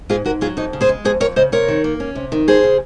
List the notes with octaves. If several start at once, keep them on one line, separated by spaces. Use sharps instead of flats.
G#2 F4 G#4
G#2 F#4 A#4
F#3 F4 G#4
F2 D#4
C#3
G#4 C5
G#3
F2 G#4 C5
F2 A#4 C#5
C#3 C5 D#5
C3 A#4 C#5
D#3
A#3
C#4
C3
D#3
F2 G#4 C5
C#3